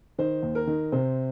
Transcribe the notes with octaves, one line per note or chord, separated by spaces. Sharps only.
D#3 C5
D#2
A#4
D#3
C3 C5